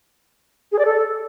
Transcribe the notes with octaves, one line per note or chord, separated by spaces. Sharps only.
G#4
D5
A4